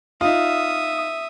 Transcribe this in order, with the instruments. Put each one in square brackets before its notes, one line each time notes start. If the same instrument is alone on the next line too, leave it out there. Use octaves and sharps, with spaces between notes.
[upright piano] D#4 F4 [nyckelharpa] E5 D#6